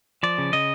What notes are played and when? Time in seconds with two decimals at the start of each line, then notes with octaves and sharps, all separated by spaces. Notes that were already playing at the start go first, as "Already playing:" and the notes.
0.23 F3 D5
0.38 C#3
0.53 C#3 D#5